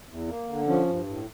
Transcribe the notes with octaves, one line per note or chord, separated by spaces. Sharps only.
E2
A#3
D3
F3 C#4
G2
A2